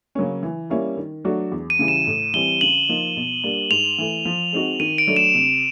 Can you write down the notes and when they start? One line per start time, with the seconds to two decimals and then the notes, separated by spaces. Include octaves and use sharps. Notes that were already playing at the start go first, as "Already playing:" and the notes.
0.15 C#3 F#3 A#3 C#4
0.43 E3
0.70 G3 A#3 C#4 E4
0.97 D#3
1.25 F#3 A3 D4 F#4
1.52 E2
1.70 D#7
1.79 C#3 E3 G3
1.88 E7
2.07 A2
2.34 E3 G3 C4 G7
2.61 C#3 F#7
2.89 F3 A#3 D#4
3.17 B2
3.43 G3 A#3 D4
3.70 G#2 F7
3.98 E3 A3
4.25 F3
4.52 G#3 C4 D#4 F#4
4.80 D#3 D#7
4.98 D7
5.07 F#3 A3 D4
5.16 E7
5.35 C3